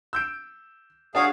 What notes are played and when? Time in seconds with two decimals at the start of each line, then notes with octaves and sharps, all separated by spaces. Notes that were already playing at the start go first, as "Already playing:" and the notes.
0.13 E6 G6 D7
1.15 D4 F#4 G#4 C#5 F5